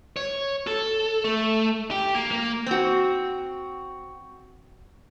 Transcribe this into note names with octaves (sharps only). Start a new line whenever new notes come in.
C#5
A4
A3
G4
A#3
A#3
C4 F#4